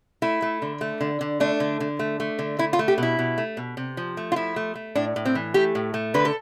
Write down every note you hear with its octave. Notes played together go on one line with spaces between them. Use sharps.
A3 E4
A3
D3
A3
D3
D3
A3 D4
D3
D3
A3
A3
D3
A3 E4
F4
A3
G4
B2 E4
B2
A3
B2
C3
F3
A3
F4
F3 E4
A3
A3
A2 D4
A2
C4
E3
A3 G4
A2
A3
D3 B4
A4